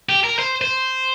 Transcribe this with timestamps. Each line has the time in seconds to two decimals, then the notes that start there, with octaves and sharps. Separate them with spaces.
0.09 G4
0.24 A#4
0.39 C5
0.61 C5